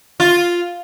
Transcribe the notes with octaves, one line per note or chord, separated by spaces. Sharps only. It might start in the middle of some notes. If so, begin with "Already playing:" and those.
F4